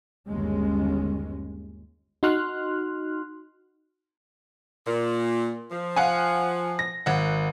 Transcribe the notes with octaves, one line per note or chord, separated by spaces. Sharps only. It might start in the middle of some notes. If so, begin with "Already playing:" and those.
G1 D#2 G#3 C#4
D#4 F#4 C6 F6 F#6
A#2
F3
F5 F#5 G#5
A#6
G#1 F#5